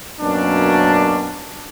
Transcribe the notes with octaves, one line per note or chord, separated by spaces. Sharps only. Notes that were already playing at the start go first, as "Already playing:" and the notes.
F#2 B2 A#3 C#4 D4